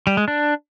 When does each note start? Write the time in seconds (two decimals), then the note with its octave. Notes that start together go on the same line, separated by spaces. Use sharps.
0.07 G3
0.17 G#3
0.28 D4